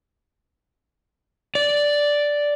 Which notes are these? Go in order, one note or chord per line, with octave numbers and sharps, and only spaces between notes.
D5